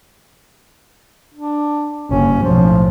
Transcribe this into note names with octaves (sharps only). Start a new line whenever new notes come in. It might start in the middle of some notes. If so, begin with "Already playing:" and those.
D4
F#1 G2 C#4
B1 A2 F3